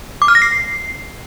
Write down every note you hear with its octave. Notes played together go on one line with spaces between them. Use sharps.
D6
F6
A#6
C7